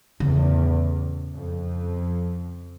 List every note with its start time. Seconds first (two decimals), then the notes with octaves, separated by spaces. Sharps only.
0.20 E2 A2 C#3
1.34 F2